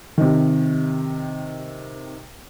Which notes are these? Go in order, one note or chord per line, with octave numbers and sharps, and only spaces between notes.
C3 D#3